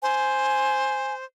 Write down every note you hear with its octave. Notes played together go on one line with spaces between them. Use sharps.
C5 G#5